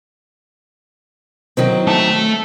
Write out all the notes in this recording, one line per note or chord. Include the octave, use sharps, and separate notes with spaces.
D#3 F#3 C4
A3 A5